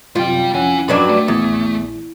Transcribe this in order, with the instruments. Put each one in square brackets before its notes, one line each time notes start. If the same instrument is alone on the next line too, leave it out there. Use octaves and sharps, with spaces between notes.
[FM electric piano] F#2 C3 [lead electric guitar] G3 G5 [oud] F4
[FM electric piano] F2 C#4 F#5 [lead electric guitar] E4 G#5
[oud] G2 F#3 D4 [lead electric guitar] B5
[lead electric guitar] A3
[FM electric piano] A#1 [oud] E2